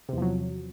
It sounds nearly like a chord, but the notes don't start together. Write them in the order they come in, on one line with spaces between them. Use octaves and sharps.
C3 E2 F3 F#3